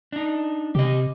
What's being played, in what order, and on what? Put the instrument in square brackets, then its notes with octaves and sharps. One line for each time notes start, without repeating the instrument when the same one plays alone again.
[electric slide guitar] D4 D#4
[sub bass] C3 [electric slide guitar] G4 D#5